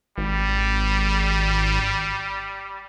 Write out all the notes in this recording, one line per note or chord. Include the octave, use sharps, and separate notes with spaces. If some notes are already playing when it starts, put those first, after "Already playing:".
G#1 G3